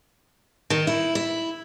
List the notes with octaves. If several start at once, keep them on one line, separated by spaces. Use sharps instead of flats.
D#3
E4
E4